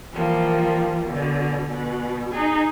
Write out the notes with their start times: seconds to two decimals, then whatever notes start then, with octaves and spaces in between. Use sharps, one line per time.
0.11 E3 F3 G3 A#3
1.06 B2 D3
1.68 B2
2.32 D#4 G#4